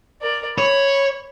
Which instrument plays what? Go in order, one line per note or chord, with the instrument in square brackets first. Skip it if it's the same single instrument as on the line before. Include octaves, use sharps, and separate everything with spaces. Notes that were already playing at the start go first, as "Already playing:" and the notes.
[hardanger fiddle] A#4 D5
[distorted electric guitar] C#5 [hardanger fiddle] B5